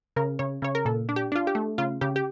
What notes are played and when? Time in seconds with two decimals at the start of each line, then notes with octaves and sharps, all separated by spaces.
0.16 C#3 A#4
0.39 C#3 C#5
0.62 C#3 C#5
0.75 A#4
0.85 A#2 A4
1.09 D4
1.16 G4
1.32 D4 F4
1.47 G4
1.55 A3
1.78 C#3 F4
2.01 C#3 G4
2.16 G4